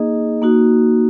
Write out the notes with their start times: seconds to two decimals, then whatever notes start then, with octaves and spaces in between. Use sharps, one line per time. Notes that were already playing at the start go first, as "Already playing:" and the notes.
Already playing: A#3 D#4 G#4 D#5
0.42 A#3 D#4 F#4